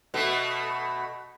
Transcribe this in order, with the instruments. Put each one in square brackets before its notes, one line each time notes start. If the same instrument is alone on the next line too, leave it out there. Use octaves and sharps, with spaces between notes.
[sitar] B2 A3